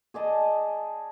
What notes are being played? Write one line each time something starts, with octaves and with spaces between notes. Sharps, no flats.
G#4 D5 D#5 A5